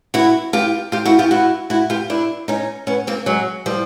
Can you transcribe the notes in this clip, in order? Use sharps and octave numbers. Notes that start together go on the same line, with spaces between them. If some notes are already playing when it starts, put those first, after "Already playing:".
E4 F#4
F4 G4
F4 G4
E4 F#4
F4 G4
E4 F#4
E4 F#4
F4 G4
D4 E4
C#4 D#4
B3 C#4
A#3 C4
F#3 G#3
F3 G3